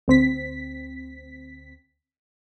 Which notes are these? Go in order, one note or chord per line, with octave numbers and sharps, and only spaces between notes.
D2 C4 B6